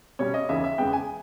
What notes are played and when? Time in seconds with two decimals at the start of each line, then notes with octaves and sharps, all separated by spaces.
0.19 B2 G3 C#4 C#5
0.34 D#5
0.49 D#2 C#3 E3 E5
0.64 E5
0.78 E2 C#3 G#3 B3 G5
0.93 G#5